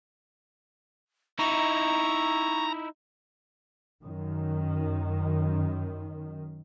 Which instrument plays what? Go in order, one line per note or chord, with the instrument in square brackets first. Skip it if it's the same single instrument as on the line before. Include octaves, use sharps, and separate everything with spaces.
[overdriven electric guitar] D#4 E4 [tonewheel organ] A#5 [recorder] C#6
[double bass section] F#2 D#3